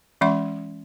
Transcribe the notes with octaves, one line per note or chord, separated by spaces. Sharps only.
E3 G#3 C#4 E5 C6